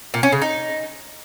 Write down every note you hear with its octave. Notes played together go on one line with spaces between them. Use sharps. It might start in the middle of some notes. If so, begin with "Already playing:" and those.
A#2
C#4
C#3
D#4